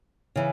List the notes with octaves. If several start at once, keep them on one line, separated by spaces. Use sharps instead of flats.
C#3 E3